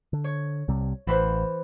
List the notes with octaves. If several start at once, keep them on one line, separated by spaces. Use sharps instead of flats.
D3
C#5
C2 C3 G3
A1 E3 B4 C5